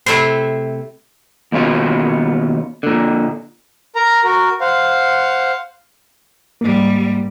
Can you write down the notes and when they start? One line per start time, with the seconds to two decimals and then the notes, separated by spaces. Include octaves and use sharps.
0.06 C3 A3 E4 C5
1.52 D#2 B2 C#4 F4
2.83 A#2 D3
3.96 A#4 A#5
4.24 F#4 A#4
4.61 C5 F5 F#5
6.61 G#2 G3 A#3